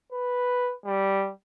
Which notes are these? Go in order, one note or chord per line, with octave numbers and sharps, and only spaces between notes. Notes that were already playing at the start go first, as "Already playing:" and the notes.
B4
G3